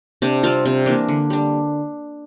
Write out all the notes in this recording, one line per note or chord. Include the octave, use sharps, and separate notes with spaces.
C3 D4 D5
G3 C4 F4 F5
C3
E3 A#3 D4
D3
G3 D4